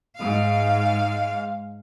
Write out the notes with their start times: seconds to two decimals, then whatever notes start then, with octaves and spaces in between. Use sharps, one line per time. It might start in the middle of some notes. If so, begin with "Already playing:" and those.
0.18 G#2 F5